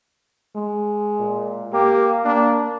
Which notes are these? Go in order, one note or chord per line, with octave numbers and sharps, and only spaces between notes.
G#3
A#2
A#3 G4
A#3 D4